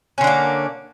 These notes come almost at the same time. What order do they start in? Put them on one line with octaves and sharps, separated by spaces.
C#4 D3 D4 A#3